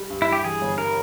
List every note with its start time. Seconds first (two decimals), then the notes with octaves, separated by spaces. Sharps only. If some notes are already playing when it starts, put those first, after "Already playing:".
Already playing: G3
0.10 G2
0.22 E4
0.28 G2 G4
0.44 E3 G#4
0.61 G1
0.78 G2 A#4